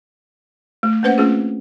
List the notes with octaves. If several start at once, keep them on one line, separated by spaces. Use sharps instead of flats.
A3
A#3 C#4 B4 C5 F#5
A3 C4 C#4 F4 G#4